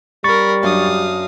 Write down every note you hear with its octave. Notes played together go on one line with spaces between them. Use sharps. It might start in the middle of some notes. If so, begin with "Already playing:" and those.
G3 C#4 A#4 B5 C#6 A6
F#2 D4 F5 D#6